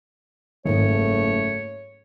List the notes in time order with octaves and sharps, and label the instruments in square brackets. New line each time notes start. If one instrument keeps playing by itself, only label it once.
[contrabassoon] F#1 [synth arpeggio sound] G#2 D#3 [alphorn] A3 [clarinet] C#5